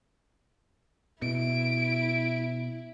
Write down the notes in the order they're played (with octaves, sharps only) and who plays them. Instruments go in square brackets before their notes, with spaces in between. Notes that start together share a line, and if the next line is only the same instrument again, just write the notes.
[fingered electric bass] B2 [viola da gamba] E4 [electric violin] D7